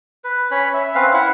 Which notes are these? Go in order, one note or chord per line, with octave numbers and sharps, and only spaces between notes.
B4
C#4 C#5 B5
E5
C4 C#4 B4 F5
E4 E5 F#5